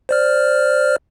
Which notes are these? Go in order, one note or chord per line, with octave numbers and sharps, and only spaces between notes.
C5 D5 F6